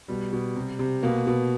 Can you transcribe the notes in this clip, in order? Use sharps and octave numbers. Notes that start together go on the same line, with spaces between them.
B2 G3
B2
C3
C3
B2 A#3
B2